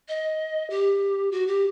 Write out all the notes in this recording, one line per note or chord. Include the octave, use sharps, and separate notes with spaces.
D#5
G4
F#4
G4